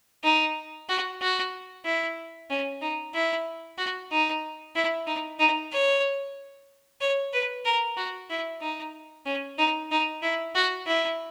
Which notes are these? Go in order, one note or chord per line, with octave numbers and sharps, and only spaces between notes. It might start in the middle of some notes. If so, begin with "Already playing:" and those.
D#4
F#4
F#4
E4
C#4
D#4
E4
F#4
D#4
E4
D#4
D#4
C#5
C#5
B4
A#4
F#4
E4
D#4
C#4
D#4
D#4
E4
F#4
E4